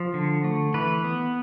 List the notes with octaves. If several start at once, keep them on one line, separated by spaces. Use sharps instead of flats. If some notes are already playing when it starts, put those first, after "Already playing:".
Already playing: F3
D3
A3
E3 B4
B3